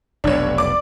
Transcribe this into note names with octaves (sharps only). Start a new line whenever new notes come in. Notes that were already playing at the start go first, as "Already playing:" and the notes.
F1 B1 D4 C#5
D5 D6